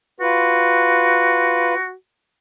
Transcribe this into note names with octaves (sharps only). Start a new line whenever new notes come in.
F4 F#4 B4